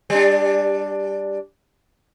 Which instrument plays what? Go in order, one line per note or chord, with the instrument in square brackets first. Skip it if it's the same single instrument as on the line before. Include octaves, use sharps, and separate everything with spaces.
[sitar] G3 D4